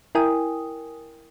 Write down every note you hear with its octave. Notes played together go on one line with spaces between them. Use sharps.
E4 A#4 G5 G#5 D#6